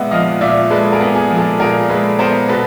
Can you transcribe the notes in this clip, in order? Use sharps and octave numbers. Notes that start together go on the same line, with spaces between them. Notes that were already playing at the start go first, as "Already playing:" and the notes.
Already playing: A#2 G#3 B3 E5 F#5
F3 D#5 F5
A#2 D5 E5
G#3 A4 B4
G#4 A#4
B3
G#4
F3
A4
A#2 G#4 A#4
G#3 A4 B4
B3 A#4 C5
B2 A4 B4